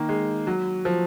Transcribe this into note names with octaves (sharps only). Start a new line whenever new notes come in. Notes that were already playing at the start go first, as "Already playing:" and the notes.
Already playing: D#3 A#3
G#3
F#3
F3